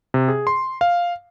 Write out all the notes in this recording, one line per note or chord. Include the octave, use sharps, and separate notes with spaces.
C3
G#4
C6
F5